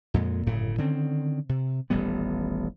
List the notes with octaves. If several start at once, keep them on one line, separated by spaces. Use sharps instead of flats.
F2 A#2 G#3
G1 F#2 A2 C#3
D3 D#3 C4 C#4
C3
D#1 A1 G3 B3